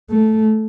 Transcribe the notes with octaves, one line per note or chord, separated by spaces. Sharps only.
A3